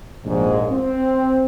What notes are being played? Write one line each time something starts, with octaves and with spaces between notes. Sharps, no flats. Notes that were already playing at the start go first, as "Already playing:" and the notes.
A#1 D#2 G#2
C4